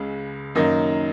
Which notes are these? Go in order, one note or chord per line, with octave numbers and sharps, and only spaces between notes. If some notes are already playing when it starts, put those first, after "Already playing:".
Already playing: C#2 C#3 G#3
F#2 D#3 A#3 D#4